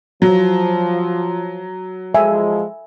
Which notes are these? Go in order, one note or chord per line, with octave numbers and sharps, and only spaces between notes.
F3 F#3
F3 G#3 E5 G#5